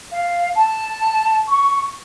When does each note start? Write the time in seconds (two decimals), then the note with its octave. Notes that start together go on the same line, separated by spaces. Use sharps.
0.13 F5
0.56 A5
1.48 C#6